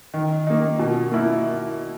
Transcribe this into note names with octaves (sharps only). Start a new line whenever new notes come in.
D#3
A#3 D#4
B2
A#3 E4